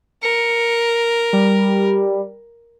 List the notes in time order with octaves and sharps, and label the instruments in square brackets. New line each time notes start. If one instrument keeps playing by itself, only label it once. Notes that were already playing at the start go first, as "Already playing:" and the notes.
[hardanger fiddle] A#4 [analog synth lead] C#7
[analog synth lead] G3